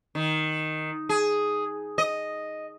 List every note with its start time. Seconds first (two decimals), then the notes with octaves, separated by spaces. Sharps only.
0.15 D#3
1.09 G#4
1.98 D#5